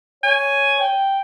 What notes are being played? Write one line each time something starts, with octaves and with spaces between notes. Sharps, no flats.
C#5 G#5
G5